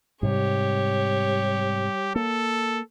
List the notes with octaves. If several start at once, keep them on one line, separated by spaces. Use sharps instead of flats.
G#2 C3 G3 G4 C#5
A#3 A4